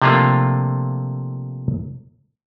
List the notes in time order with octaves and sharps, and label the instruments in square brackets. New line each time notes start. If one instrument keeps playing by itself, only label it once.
[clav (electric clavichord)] C3 F3 A3 A#3 D4 F4